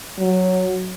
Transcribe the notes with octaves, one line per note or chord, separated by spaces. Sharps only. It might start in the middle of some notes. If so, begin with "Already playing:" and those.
F#3